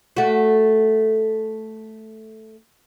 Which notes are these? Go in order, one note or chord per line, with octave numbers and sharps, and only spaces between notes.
A3 F#4